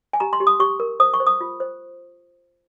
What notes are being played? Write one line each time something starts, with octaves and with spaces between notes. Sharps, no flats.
G#5
G4 A#5
C6
G4
D#6
G4 C#6
A#4
C5 D#6
C#6
C5
D#6
F4
C5